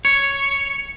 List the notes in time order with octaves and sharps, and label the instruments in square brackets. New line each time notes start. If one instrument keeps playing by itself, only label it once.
[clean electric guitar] C#5